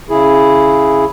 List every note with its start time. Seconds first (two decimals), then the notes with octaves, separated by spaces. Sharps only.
0.10 C#3 E4 G#4